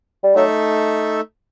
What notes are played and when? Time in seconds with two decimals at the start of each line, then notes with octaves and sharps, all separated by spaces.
0.24 G3
0.35 F#3 A3 D#4 A4 E5